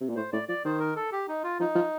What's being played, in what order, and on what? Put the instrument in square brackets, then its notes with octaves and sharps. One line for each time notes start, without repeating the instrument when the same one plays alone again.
[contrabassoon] C3
A#2
[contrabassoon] A2 [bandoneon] C5
[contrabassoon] A2 [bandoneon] D5
[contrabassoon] F3 [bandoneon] D5
[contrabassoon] D#3 [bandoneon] C5
[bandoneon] A#4
A4
G4
D#4
F4
[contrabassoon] F3 [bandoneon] D#4
[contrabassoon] F3